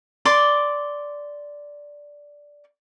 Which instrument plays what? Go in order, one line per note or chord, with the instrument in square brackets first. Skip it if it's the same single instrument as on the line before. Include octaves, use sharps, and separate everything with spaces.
[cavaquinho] D5 C6 D6